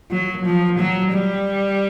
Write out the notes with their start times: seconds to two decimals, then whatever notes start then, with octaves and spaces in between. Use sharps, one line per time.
0.11 F#3
0.45 F3
0.79 F#3
1.13 G3